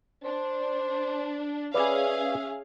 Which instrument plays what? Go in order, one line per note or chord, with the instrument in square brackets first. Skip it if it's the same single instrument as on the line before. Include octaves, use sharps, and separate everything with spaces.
[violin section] D4 [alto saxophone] C5
[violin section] C#4 G#4 F5 [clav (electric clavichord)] B4 D5 [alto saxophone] E5